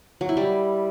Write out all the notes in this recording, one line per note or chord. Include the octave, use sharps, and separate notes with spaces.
F#3
E4
G3